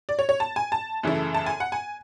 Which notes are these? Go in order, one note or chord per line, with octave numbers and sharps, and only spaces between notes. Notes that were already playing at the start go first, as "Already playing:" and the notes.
D5
C#5
C#5
A5
G#5
A5
F#2 C#3 E3 A3 E4
A5
G#5
F#5
G#5